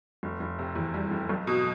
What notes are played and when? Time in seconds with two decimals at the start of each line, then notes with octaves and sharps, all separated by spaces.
0.23 F1
0.40 F1
0.59 C3
0.75 E2
0.94 G3
1.11 F1
1.29 B1
1.47 B2